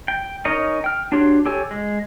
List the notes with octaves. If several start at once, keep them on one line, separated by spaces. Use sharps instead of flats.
G5
C#4 D#4 A#4 C#5 D#5
G5 F6
D4 F#4 G4 C#5 C6
G4 A4 C#5 G#5
G#3